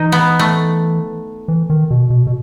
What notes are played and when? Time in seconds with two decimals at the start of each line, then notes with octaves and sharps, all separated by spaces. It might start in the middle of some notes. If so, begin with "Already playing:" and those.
Already playing: E3 D#4
0.12 B3
0.39 A3
1.48 E3
1.70 D#3
1.91 B2
2.10 B2
2.27 B2